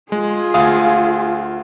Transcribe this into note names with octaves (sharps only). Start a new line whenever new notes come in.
G#3 F4 G#4
D2 F5 D#6